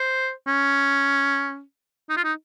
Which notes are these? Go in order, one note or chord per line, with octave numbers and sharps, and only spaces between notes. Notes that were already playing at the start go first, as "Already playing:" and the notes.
Already playing: C5
C#4
D#4
F4
D#4